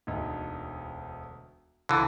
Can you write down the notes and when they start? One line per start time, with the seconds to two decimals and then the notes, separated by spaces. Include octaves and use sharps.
0.07 E1 D2 D#4
1.89 C#2 D3 E3 A6